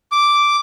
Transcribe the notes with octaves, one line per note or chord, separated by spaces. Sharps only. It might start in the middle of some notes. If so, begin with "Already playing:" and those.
D6